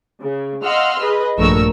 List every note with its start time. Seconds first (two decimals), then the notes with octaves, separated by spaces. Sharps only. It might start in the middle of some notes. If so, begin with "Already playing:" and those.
0.21 C#3
0.64 D#5 F5 F#5 C6 E6 F6
1.00 G#4 B4 D#5
1.37 A#1 G2 A3 A#4 C#6 E6